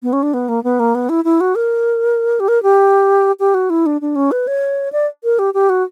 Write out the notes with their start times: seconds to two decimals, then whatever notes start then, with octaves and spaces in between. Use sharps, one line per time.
0.03 B3
0.13 C#4
0.23 D4
0.34 B3
0.49 A#3
0.64 B3
0.79 A#3
0.95 B3
1.09 E4
1.24 E4
1.40 F#4
1.55 A#4
2.40 G4
2.48 A#4
2.63 G4
3.40 G4
3.54 F#4
3.70 E4
3.86 D4
4.01 D4
4.15 C#4
4.31 B4
4.47 C#5
4.92 D5
5.24 A#4
5.39 G4
5.54 G4
5.69 F#4